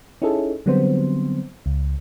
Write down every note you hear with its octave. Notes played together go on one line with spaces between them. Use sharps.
C#4 D#4 E4 G#4 A4
D3 F#3 G3 B3 C4 C5
C#2